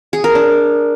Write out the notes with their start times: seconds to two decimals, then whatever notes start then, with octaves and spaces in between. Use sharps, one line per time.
0.13 G#4
0.24 A#4
0.35 D4